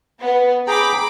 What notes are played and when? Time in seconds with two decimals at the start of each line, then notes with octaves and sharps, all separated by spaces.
0.21 B3
0.67 G#4 G5 A#5 B5 D6